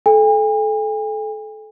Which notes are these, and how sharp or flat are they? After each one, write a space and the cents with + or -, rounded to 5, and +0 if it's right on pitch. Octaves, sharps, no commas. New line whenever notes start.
A4 -30 G#5 -45